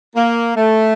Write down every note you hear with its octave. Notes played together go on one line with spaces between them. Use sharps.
A#3
A3